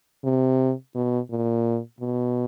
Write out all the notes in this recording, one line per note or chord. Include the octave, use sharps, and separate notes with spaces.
C3
B2
A#2
B2